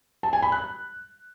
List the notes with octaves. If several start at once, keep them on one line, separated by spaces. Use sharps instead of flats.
A5
G#5
B5
F#6